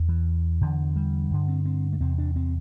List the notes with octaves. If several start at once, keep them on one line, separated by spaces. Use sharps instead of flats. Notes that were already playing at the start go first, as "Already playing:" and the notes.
Already playing: E2
E3
E2 D3
G3
G2 D3
C4
C4
A3
E2 C3 C4
D4
C4